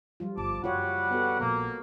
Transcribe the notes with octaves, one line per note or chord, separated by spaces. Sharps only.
F3 G3 F4
G1 A5 D6
F#1 G3 F4 F#4 C#5 F#5
B3 F#4 A4
A#1 A#3